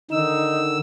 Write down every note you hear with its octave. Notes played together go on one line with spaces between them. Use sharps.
D3 D#3 D#4 E6